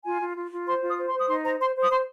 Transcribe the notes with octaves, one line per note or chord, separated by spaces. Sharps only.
F4 G#5
F4
F4
F4
C5 C6
F4 D#6
C5
C6
C5
D#6
D#4 C6
C5 A#5
C5 C6
C5
D#6
C5 C6